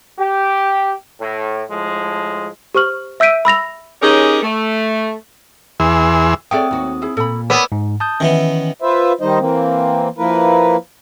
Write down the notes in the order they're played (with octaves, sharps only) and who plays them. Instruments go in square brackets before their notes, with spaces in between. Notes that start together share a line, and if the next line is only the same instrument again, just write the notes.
[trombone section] G4
A2
A2 F3 G#3
[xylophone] G4 C5 C#6 F6 F#7
E5 E6 G6 B6 D7 D#7
B5 E6 A#6 F7
[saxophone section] C#4 D#4 G4 G#4 A#4 C#5
A3
[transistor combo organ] E2 E3 G#4 C6 E6
[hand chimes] C4 D#6 [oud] G#4 A4 C#5 [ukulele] D5 E5 G5
[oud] D#2 F#4
[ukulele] E4 G#4
[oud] A#2 [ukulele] A4 B5
[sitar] B3 [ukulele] A#4 C#5 G#5 [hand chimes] D5 D6 E6
[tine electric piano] G#2
A5 D#6 G6
[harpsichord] D#3 E3 B3 [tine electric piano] C#4
[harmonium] F4 B4 C5 E5
D#3 G3 D#4 C5 D#5
E3 A#3 C4
F3 A#3 E4 A#4 B4